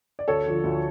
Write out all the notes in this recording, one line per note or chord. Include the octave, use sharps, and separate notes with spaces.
D5
D2 A4 C#5
D3 F3
D2